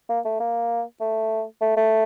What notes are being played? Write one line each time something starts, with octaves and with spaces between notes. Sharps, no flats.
A#3
A3
A#3
A3
A3
A3